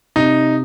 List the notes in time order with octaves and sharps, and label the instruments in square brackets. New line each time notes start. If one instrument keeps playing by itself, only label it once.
[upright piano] C3 [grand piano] D#4